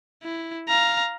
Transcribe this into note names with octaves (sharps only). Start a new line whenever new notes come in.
E4
F5 A#5